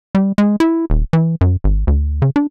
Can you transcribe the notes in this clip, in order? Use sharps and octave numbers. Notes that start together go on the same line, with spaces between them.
G3
G#3
E4
D#1
E3
F#2
G#1
D2
C#3
D4